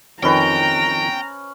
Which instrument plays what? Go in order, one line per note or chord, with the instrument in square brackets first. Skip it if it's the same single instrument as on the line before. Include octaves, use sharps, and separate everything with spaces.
[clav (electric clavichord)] F2 D#3 [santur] C#4 B4 [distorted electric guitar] G5 [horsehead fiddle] A#5